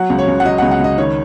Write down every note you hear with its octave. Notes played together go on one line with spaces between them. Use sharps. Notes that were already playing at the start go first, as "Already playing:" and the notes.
Already playing: F#3 F#5
C#2
C#5
C#2
F#5
F#3 D#5
C#2 F#5
F#5
C#2 D#5
D#3 C#5